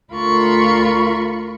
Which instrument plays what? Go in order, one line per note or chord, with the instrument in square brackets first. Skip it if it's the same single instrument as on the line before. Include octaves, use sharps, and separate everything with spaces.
[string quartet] D2 F4 A#4 B5 C#6